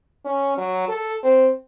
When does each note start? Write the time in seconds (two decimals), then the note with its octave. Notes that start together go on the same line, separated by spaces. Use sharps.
0.25 C#4
0.57 F#3
0.88 A4
1.23 C4